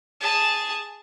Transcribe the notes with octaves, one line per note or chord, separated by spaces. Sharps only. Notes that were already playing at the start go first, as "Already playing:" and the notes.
G#4 A5